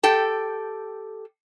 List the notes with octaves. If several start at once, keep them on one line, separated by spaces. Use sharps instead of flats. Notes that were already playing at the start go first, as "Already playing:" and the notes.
G4 A4 G5